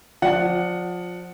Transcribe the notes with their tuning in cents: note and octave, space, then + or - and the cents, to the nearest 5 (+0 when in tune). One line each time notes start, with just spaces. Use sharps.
F3 +25 D5 +0 F#5 +0